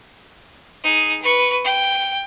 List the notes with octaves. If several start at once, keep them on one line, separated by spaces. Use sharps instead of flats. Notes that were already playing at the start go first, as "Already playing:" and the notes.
D#4 G#4
B4 C#6
G5